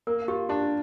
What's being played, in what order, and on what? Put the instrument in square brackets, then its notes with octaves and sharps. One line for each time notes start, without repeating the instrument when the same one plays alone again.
[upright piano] A#3 [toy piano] A#4
[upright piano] F4 [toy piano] G4
[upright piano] D4 [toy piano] G4